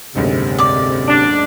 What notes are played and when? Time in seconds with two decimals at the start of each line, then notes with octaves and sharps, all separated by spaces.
0.15 F#1 D2 G#2 C3
0.58 D5 D6
1.08 D4